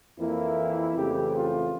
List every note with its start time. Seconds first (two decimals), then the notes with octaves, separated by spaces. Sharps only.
0.19 F2 E3 A#3 E4
0.95 F2 C#3 E3 A3 G4
1.34 F4